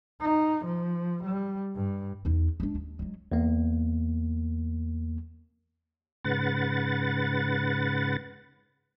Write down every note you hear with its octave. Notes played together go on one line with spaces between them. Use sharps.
D#4
F3
G3
G2
E2 D#4
G#3 D4
D#2
F#3 G#3
E2 A#3
G#2 C#3 B4 F#5 A6